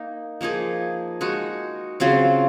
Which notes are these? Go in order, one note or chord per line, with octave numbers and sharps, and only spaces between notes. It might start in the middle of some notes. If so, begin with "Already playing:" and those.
Already playing: A#3 D#4
F3 A#3 D#4 G#4
G#3 D#4 F#4
C#3 F#3 C4 F4